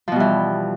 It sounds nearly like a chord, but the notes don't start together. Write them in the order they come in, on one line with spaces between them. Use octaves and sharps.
F3 B2 G3 E3